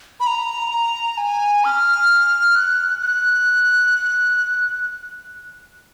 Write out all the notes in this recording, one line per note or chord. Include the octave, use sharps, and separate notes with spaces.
B5
A#5
G#5
F6
F#6
F#6